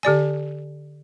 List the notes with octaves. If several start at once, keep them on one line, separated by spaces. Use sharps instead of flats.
D3 G4 D5 G#5